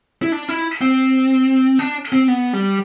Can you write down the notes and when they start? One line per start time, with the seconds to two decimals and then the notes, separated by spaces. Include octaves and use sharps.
0.22 E4
0.32 D4
0.49 E4
0.81 C4
1.79 D4
2.13 C4
2.28 B3
2.53 G3